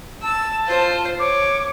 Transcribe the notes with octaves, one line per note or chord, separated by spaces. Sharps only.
A5 E6
F4 C5
C#5 D6